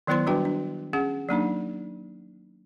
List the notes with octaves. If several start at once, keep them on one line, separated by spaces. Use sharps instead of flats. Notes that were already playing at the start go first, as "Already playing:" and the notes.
D#3 F#3 B3 E4 C5 C6
G3 D4 F#4 B4 G5
D4
C#4 G#4 F#5
F#3 A#3 D4 D#4